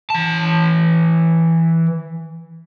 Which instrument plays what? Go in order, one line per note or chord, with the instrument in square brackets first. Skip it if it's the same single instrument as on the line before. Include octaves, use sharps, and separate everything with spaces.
[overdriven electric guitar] E3 A5